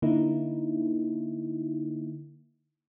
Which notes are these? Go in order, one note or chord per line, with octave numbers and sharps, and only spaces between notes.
D3 A#3 D#4 E4